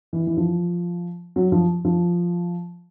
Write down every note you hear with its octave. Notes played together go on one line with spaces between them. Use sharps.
E3
E3
F3
F#3
F3
F3